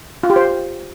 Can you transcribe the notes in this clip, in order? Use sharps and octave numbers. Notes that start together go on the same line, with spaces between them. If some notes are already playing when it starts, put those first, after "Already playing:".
F4
G4
C5